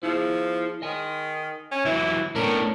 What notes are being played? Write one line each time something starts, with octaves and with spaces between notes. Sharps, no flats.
F3 E4 G#4
D#3 D#5 G#5
C#4
E3 F#3 E4
A2 B3 C#4 D4 A#4